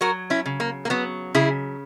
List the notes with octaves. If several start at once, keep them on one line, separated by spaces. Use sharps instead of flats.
F#3 F#4 A#4
C#4 E4
C#3
A#3
A#3
F#3 B3
C#3 E4 G#4